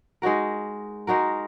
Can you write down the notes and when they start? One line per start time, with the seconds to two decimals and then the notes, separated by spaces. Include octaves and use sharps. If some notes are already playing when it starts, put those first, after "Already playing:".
0.22 G#3 D#4 F#4 A#4
1.07 G#3 D#4 F#4 A#4